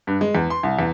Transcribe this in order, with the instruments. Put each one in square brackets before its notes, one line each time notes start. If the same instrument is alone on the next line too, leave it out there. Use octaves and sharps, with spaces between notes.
[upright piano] G2
G#3
E2
C6
C2
E2